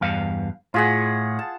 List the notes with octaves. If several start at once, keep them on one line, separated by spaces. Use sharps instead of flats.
E2 G2 F5
A2 F4 G#4 F#5
A5